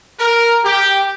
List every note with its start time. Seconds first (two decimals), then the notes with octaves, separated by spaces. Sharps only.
0.19 A#4
0.64 G4